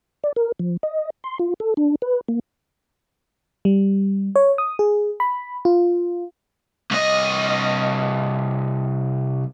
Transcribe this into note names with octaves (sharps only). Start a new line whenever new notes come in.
D5
A#4
F3
D#5
C6
F4
A4
D4
B4
A#3
G3
C#5
D#6
G#4
B5
F4
C2 D#5